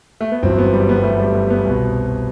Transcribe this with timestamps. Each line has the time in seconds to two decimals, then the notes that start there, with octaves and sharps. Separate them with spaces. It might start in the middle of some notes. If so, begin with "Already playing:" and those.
0.21 A3
0.31 B3
0.43 G1 F#2 E3 C4
0.58 B3
0.73 G3
0.89 B3
0.98 G3
1.04 A3
1.20 G3
1.35 A3
1.50 B3
1.65 C2 B2